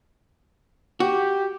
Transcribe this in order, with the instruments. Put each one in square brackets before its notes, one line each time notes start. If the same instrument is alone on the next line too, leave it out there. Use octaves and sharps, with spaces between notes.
[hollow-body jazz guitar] F#4 [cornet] G4